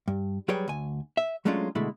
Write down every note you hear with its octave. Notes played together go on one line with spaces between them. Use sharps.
G2
F#3 G3 G#4 B4 C#5 G5
D2 G#5
E5
F#3 G#3 A3 C#4 D4 F4
B2 D3 G#3 A3 E4